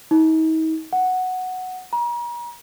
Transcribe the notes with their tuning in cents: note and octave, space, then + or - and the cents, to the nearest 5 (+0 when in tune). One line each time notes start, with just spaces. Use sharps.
D#4 +40
F#5 +0
A#5 +40